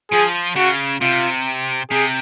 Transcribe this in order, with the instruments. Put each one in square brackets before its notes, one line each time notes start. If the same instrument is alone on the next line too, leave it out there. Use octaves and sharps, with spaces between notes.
[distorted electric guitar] F3 [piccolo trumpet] G#4
[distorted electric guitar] C#3 [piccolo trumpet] F#4
[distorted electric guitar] C3 [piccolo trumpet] F4
[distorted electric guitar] C3 [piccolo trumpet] G#4